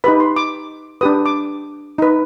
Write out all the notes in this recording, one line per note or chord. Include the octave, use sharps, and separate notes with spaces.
D#4 G4 B4 B5
C6
D6
D4 G4 B4 D#6
D6
D#4 B4